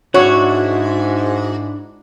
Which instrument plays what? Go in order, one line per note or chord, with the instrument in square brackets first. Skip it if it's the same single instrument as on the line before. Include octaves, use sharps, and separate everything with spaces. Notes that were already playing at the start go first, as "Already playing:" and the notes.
[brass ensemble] G#2 [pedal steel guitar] D4 E4 F#5 [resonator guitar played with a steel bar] F#4 [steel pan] C#5